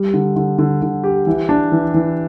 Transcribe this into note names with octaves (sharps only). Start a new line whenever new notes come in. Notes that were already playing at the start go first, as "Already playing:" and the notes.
Already playing: G3
D3
D3
D3
D3
G4
E3
D4
E3
E3